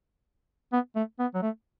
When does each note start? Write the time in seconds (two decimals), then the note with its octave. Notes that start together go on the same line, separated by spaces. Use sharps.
0.73 B3
0.96 A3
1.19 B3
1.34 F#3
1.42 A3